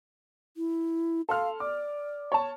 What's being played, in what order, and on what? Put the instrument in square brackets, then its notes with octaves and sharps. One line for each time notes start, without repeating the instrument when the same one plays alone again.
[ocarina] E4
[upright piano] A4 C6 F6 [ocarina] F5
[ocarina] D5 [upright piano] D6
[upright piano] C#5 A5